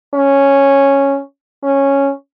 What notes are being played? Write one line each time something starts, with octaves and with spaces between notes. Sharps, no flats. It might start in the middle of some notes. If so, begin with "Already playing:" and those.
C#4
C#4